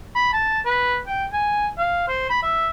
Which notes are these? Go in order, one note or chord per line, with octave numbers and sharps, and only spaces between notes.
B5
A5
B4
G5
G#5
F5
C5
B5
E5